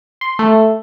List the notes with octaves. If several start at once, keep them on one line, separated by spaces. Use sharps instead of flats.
C6
A3